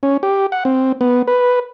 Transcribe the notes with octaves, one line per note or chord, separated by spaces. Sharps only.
C#4
G4
F#5
C4
B3
B4